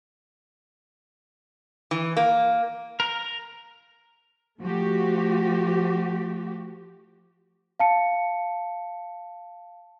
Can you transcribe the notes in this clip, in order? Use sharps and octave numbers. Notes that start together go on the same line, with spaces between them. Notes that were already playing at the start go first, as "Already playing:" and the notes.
E3
A#3
A#4
F3 A3 F#4 G4
F5 A5 C#7